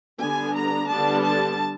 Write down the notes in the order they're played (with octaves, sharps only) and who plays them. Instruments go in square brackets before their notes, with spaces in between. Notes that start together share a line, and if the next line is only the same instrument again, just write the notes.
[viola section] D3 G3 B3 D4 G#5
A#5
D3 G3 B3 D4 A5
A5